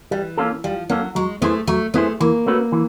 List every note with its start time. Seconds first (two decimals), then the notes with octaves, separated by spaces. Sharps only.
0.11 E3 G3
0.38 A#3 C#4 F4 A4
0.64 F3 G3
0.89 F#3 A#3 C#4 F4 A4
1.15 F#3 G#3
1.42 A3 B3 E4 G#4 C5
1.67 F#3 A3
1.94 A3 B3 E4 G#4 C5
2.20 E3 A#3
2.46 A3 C#4 F#4 B4
2.72 E3